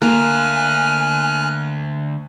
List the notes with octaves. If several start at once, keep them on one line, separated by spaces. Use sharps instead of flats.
D2 A#3 G#5 F6 F#6